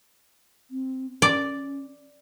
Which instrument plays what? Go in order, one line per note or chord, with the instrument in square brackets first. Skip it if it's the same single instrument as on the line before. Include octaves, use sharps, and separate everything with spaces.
[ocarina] C4
[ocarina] C#4 [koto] D5